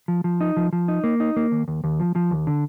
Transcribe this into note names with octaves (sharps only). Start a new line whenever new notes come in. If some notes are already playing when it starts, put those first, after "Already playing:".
F3
F3
D#4
F3
F3
D#4
A#3
D#4
A#3
D#2
D#2
D#2
F3
F3
D#2
D3